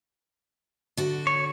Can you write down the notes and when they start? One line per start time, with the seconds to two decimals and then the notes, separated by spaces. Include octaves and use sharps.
0.97 D3 F#4
1.27 C#5